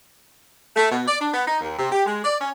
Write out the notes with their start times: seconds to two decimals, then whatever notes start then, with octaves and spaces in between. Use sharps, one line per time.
0.76 A3
0.91 B2
1.06 D5
1.19 D4
1.34 B3
1.47 D#4
1.61 D#2
1.78 C3
1.91 G4
2.06 G#3
2.24 D5
2.40 C#4